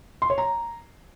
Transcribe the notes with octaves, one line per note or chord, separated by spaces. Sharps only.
C6
C#5
A#5